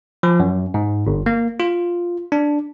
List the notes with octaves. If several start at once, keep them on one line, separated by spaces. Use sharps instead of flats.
F3
F#2
G#2
G1
A#3
F4
D4